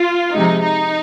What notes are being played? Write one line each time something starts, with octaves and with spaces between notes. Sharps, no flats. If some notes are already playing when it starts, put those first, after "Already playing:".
Already playing: F4
C3 F3 G#3 D#4
D#4